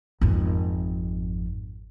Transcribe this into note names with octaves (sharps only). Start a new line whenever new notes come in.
G#1 F2